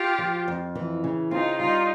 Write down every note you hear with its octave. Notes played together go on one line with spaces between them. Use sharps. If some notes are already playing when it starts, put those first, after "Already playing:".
Already playing: F4 G4
F3
F2
E3
C#3
C4 D#4 F4
G3 D#4 F4